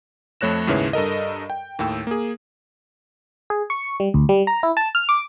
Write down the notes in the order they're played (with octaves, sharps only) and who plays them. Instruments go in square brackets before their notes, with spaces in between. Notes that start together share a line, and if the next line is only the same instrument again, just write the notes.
[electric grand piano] F2 A3 C#5 F#6 A#6 E7
D#2 G#2 C#3 E4 B4 C#5
G2 A4 A#4 D#5
G5
D#2 A2 G5 E6
A#3 G#4
[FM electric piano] G#4
C#6
G3
D2
G3
A#5
E4
A5
F6
D6